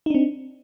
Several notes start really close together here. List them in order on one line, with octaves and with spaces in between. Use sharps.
D#4 D4 C4